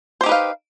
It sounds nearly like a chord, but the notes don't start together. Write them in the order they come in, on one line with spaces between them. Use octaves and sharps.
C5 G4 D#4 B4 F5